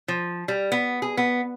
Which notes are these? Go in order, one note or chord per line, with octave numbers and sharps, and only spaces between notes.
F3
G3
B3
G#4
B3